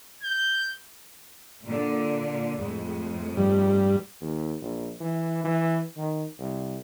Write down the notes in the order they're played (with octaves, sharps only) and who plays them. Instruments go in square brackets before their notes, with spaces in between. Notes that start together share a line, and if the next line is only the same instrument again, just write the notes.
[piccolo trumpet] G6
[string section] A#2 D3
F2 A2 G#3
[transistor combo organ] G2 G3
[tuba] D#2
A#1
E3
E3
D#3
C2